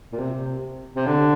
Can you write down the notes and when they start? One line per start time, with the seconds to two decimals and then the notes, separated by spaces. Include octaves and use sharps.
0.12 A#2
0.18 C3
0.95 C3
1.06 D3